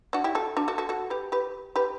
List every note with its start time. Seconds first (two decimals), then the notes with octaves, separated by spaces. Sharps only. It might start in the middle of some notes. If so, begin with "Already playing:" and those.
0.13 D4 F#4
0.24 E4 G4
0.35 F#4 A4
0.57 D4 F#4
0.68 F#4 A4
0.78 F#4 A4
0.89 F#4 A4
1.10 G4 B4
1.32 G4 B4
1.76 G4 B4